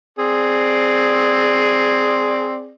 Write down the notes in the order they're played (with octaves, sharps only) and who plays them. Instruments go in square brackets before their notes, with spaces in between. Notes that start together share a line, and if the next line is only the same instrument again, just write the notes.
[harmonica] C4 G#4 D5